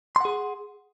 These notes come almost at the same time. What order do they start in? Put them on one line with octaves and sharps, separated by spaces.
C6 F#5 G#4